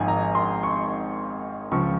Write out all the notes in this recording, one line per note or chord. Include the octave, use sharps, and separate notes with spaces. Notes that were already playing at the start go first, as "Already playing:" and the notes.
Already playing: G#1 G#2 F3 G#5
A#5
C6
C#6
C#2 C#3 F3 C#6